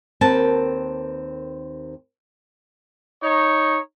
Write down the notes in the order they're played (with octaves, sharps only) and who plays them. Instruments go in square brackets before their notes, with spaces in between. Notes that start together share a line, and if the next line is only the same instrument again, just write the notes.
[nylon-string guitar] D#2 C4 A#4 B4 A5
[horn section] D#4 C#5